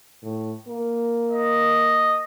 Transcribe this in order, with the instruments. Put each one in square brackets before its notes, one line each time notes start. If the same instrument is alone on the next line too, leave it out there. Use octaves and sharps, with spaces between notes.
[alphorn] A2
A#3
[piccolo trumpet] D#5